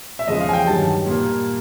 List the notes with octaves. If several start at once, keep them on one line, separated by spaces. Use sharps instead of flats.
E5
E2 C#3 F3 G#3 D#5
F5
G#5
G5
G2 D#3 F#3 A5
A#2 G3 A#3